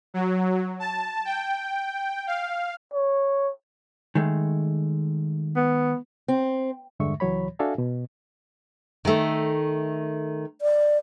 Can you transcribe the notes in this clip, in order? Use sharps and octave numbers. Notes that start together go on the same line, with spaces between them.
F#3
A5
G5
F5
C#5
D#3 G#3 A3
B3
C4
E2 G2 D3 G#3 E5 C#6
C#2 E3 F#3 C#5 B5
D4 F#4 A4 E5 F5 G#5
B2
D#3 A3
D5